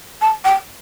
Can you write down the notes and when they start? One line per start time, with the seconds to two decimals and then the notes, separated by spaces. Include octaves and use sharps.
0.21 A5
0.45 G5